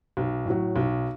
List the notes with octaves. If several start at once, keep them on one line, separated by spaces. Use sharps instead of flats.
B1
A2 F#3
B1